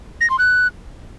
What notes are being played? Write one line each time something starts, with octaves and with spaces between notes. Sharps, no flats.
A#6
C6
F#6